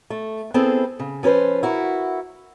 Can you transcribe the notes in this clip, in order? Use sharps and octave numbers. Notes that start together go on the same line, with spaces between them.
A3
B3 C4 E4 G#4 A4
C#3
F3 C#4 A4 B4 C5
E4 F#4 A#4